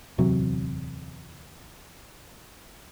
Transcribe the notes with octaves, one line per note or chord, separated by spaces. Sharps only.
D1 E2 C3 F#3